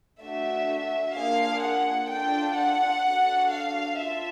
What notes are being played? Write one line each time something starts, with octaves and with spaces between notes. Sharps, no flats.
A3 D4 F#4 E5
A#3 D4 F4 G#4 F5
F#5
D4 F4 A4 G5
F#5
D4 F#4 A4
F5
F4 A4 E5